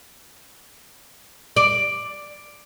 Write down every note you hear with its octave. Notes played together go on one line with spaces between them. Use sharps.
D5